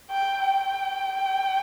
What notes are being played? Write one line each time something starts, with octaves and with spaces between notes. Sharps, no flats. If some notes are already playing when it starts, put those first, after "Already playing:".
G5
G5